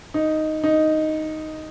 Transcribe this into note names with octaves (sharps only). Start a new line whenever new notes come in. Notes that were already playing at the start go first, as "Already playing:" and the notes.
D#4
D#4